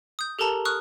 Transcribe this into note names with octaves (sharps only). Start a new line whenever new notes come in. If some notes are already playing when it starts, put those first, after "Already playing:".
D#6 G6
G4 A4 A#4 A5 A#5
C#6 D#6 F6 F#6